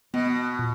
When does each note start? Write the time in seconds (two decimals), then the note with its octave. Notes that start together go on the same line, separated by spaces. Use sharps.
0.14 B2 B3
0.59 A#2